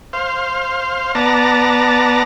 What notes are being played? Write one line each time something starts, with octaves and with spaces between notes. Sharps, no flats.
C5 F5
B3 D5 A5 A#5